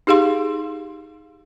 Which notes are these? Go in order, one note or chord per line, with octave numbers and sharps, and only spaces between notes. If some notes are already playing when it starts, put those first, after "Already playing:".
D#4 G4 G#4 F5 C6